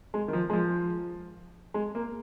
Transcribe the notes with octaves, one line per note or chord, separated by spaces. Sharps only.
G#3
D#3
F3
G#3
F3
G#3
A#3